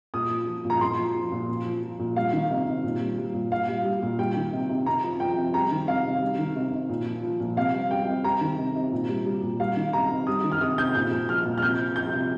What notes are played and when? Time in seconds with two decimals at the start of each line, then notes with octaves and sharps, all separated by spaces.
0.14 A#2 D#6
0.30 F3
0.48 F3
0.65 A#2
0.70 A#5
0.81 A#2 C6
0.98 F3
1.15 F3
1.32 A#2
1.49 A#2
1.65 F3
1.83 F3
1.99 A#2
2.16 G3 F5
2.33 D#3
2.50 C3
2.67 C3
2.84 A#2
3.01 G3
3.18 G3
3.34 A#2
3.51 A#2 F5
3.68 G3
3.85 G3
4.02 A#2
4.19 G3 G5
4.36 D#3
4.53 C3
4.69 C3
4.86 C3 A#5
5.04 F3
5.20 F3 G5
5.37 C3
5.54 G3 A#5
5.71 D#3
5.88 C3 F5
6.05 C3
6.21 G3
6.39 D#3
6.56 C3
6.72 C3
6.89 A#2
7.06 F3
7.23 F3
7.40 A#2
7.57 C3 F5
7.73 G3
7.91 G3 G5
8.08 C3
8.24 G3 A#5
8.41 D#3
8.58 C3
8.75 C3
8.92 A#2
9.09 G3
9.26 G3
9.43 A#2
9.60 G3 F5
9.77 D#3
9.93 C3 A#5
10.10 C3
10.27 G3 D#6
10.44 D#3
10.52 F6
10.61 C3 D#6
10.78 C3 G6
10.95 A#2 G6
11.11 F3
11.28 F3 F6
11.46 A#2
11.58 F6
11.62 C3 G6
11.79 F3
11.96 F3 G6
12.13 C3